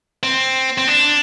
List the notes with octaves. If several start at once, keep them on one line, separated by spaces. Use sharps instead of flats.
C4
C4
D4